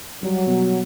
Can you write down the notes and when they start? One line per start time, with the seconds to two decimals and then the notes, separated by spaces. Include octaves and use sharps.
0.23 F#3 G3
0.47 B2